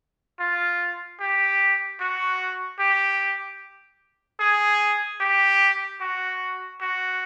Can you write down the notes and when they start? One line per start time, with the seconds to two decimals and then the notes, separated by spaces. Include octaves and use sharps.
0.40 F4
1.20 G4
2.00 F#4
2.79 G4
4.40 G#4
5.21 G4
6.01 F#4
6.81 F#4